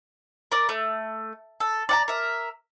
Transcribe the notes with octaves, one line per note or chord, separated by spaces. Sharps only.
A#4 D5
A3
A4
D5 F#5 A#5
A#4 E5